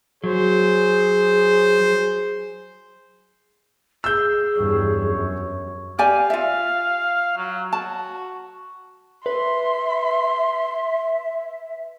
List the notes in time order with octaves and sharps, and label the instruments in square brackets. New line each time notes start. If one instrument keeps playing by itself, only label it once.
[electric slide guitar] F#3 [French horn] G#4 [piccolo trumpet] C5
[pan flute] G#4 [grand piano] E6 G6
[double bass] E2 G2 [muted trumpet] C#5
[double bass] F#2
[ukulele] G4 D5 G#5 [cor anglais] F5
[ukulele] F4 E5
[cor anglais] F#3
[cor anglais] F#4 [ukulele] A5
[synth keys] B4 [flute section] E5 [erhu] C6